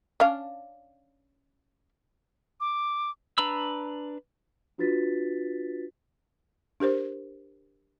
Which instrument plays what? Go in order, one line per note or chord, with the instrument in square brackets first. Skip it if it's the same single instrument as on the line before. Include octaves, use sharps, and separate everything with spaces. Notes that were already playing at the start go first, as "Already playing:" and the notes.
[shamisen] C#4 D4 F5
[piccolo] D6
[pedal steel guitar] D4 B4 A#5 B5 E6
[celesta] D4 F4 F#4 B4 A6 B6
[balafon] D4 G4 A#4 C5